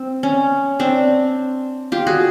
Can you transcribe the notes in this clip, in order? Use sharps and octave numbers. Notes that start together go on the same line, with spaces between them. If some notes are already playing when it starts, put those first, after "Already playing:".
Already playing: C4
C#4
C4 D4
F4 G4
F#4 G#4